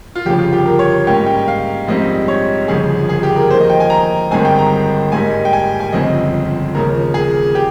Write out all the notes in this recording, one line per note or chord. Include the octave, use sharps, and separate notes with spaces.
F4
G1 F2 C#3 F3 G4
F4
G4
A#4
C#5
G#2 G3 A#3 C#4 G5
G5
F5
A#1 G#2 G3 C4 D#4 D#5
C#5
G1 F2 C#3 F3 G#4
G#4
G4
A#4
F2 D#3 A#3 C5
D#5
G5
G#5
A#5
G1 G2 D#3 G#3 C4 G#5
G5
A#5
G#2 G3 A#3 D#4 G#5
G5
G#5
G#5
G1 F2 C#3 G#3 C4 D#5
D#2 C#3 F3 A#3 A#4
G#4
G4